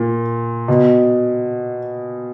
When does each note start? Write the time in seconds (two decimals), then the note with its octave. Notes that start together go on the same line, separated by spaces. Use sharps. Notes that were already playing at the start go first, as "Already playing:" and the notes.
Already playing: A#2
0.68 B2